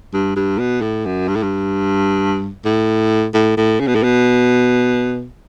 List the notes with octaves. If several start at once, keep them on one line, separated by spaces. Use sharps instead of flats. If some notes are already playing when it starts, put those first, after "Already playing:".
G2
G2
B2
A2
F#2
G2
A2
G2
A2
A2
A2
C#3
B2
A2
B2